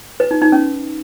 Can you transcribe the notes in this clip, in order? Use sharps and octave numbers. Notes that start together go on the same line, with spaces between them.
B4
D#4
D#4
C#4